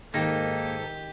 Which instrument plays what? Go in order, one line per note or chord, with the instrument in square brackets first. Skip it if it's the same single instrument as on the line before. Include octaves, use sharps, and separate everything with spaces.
[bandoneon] G#2 A4 [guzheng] D#3 [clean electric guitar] A#3 D#4 [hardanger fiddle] G4